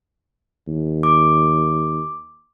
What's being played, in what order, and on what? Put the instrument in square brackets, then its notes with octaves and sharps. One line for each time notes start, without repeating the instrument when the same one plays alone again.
[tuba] D#2
[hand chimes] D6